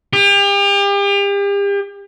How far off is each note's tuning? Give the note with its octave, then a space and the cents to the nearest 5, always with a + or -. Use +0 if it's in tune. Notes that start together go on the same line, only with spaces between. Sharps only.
G4 +40